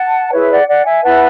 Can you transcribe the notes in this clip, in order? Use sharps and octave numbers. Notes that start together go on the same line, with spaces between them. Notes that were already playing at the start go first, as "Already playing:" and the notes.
Already playing: F#5 A5
E4 G#4 B4 C#5 E5
D5 F#5
D5 F#5
E5 G#5
E4 B4 F#5 A5